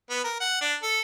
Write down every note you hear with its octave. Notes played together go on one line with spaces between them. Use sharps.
B3
A#4
F#5
D4
A4